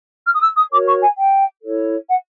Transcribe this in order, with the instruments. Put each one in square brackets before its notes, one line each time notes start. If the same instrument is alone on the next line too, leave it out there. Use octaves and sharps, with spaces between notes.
[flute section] F6
D#6
E6
D#6
F#4 A#4 C#5 D6
C#6
G#5
G5
E4 A4 C#5
F#5